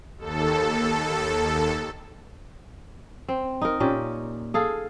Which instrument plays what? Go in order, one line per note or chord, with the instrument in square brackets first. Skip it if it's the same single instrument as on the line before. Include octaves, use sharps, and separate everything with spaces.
[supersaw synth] D#2 A4
[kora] C4
D#4 A#4
A#2 C#4 G4
G#4 A4 F5